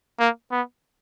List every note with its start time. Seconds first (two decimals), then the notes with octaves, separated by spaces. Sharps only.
0.19 A#3
0.51 B3